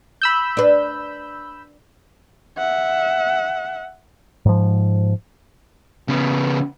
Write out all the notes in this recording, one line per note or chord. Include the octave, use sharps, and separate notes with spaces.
B5 E6 G6
D4 B4
E5 F#5
G#2 F3
C#3 B3